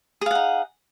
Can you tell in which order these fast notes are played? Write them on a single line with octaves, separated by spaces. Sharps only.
G#4 F5 F#5 D#4